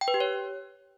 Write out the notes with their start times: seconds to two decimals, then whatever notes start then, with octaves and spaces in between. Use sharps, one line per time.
0.01 G5
0.08 B4
0.14 G4
0.20 C#5